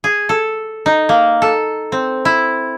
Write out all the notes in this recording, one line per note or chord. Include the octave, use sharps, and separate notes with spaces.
G#4
A4
D#4
A#3
A4
C4
E4